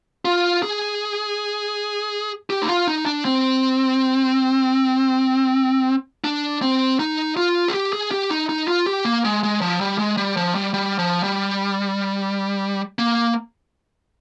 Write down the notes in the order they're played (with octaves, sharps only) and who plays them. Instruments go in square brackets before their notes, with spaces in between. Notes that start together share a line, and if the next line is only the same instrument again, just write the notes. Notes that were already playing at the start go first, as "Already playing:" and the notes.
[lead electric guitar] F4
G#4
G4
D#4
F4
D#4
D4
C4
D4
C4
D#4
F4
G#4
G4
G#4
G4
D#4
D#4
F4
G4
A#3
G#3
G#3
F3
G3
G#3
G3
F3
G3
G3
F3
G3
A#3